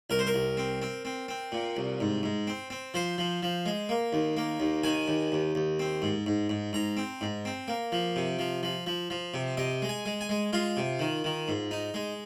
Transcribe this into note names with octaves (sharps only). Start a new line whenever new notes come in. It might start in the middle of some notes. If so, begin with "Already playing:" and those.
C2 A#4
C5
A#4
C2
C4
C4
C4
C4
A#2
C2
G#2
G#2
C4
C4
F3 C5
F3
F3
G#3
A#3
D#2
A#3
D#2
D#3 G#5
D#2
D#2
D#2
C4
G#2
G#2
G#2
G#2 A#5
C4
G#2
C4
A#3
F3
C3
F3
F3
F3
F3
C3
C3 D#5
G#3
G#5
G#3
G#5
G#3
G#3 F4
C3
D#3
D#3
G#2
D#4
G#3